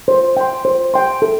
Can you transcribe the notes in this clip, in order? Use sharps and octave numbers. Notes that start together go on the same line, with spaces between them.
C5
G5 C6
C5
G5 C6
A4